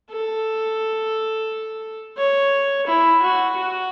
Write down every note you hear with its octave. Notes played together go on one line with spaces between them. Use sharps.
A4
C#5
E4
F#4
F#4